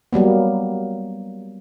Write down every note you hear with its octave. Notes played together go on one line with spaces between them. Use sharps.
F#3 G3 A#3 B3